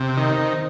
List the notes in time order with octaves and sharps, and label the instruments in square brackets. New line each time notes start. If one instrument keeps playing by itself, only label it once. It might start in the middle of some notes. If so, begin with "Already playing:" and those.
Already playing: [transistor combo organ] C3 [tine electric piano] C5
[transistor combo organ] D#3